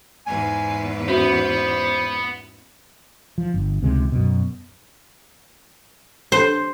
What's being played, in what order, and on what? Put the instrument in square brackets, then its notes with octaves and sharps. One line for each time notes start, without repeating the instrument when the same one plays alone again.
[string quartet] E2 G#2 B4 [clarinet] G#5
[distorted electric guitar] B3 [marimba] C#4 F#4 E5 [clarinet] C5
[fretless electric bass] F3
G1
C#2 C3 D#3 G#3
F#2 B2
[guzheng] C5